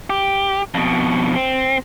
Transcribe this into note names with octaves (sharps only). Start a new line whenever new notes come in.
G4
F2 B2
C4